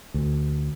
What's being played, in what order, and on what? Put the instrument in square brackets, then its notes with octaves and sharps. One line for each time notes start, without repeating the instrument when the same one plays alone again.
[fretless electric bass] D2